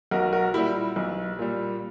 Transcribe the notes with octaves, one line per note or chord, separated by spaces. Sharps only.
B1 F#4 A#4
F#4 A#4
A#2 G3 E4 G4
B1
A#2 G3